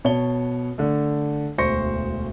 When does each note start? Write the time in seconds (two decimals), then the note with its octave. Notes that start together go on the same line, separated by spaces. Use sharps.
0.05 B2 C#5 A5 G7
0.78 D3 A3
1.58 E1 D2 C5 C#6 A#6 C#7